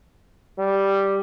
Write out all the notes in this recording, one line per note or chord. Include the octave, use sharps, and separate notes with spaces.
G3